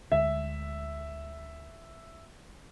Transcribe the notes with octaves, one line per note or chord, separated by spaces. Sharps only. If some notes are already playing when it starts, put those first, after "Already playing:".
D2 D3 G#3 E5